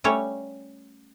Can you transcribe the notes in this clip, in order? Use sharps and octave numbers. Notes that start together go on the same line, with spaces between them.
G3 A3 C#4 C#5